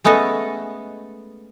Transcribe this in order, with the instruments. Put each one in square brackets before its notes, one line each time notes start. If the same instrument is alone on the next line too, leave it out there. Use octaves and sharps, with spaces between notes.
[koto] G#3 A3 B3 C#4 A4 D#5